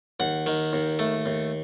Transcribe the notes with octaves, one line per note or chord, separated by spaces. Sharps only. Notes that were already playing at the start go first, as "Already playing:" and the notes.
D#2 F#5
D#3
D#2
A3
D#2